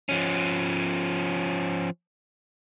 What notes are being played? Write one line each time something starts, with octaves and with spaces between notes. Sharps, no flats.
F3 C#4